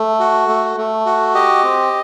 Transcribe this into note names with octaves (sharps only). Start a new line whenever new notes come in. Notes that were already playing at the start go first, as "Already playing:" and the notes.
Already playing: A3
F#4
A3
A3
F#4
G4 D#5
C4